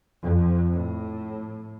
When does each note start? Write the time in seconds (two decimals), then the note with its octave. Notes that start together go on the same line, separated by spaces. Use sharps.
0.23 F2
0.73 A2